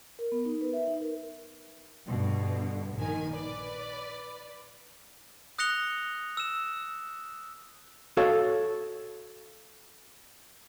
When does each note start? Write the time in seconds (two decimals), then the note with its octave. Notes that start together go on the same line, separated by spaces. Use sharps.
0.19 A#4
0.32 B3
0.45 D#4
0.61 B4
0.73 E5
0.87 D#4
1.01 A#4
2.08 G2 B2 D3
2.96 A#1 D#3 G#5
3.33 B4 D5
5.59 D#6 F#6 A#6 C#7 F7 G7
6.37 E6 E7
8.17 F#4 A4 C#5 F5